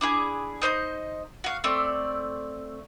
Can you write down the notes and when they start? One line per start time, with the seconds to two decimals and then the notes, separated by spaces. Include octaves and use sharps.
0.01 D4 E4 G#4
0.62 D#4 C5 C#5 D#5
1.44 F#4 F5
1.64 A3 C4 D5